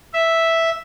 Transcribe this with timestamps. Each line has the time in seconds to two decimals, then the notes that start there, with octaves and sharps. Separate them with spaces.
0.14 E5